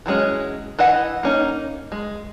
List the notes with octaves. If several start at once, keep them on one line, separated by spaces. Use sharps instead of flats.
E3 F#3 G#3 C#4
E3 B4 D#5 F#5
A#3 C#4 D#4
G#3